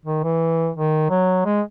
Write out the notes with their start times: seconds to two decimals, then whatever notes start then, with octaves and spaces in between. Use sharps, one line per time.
0.06 D#3
0.23 E3
0.76 D#3
1.10 F#3
1.46 G#3